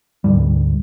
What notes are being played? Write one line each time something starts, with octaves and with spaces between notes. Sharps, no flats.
D2 G#2 G3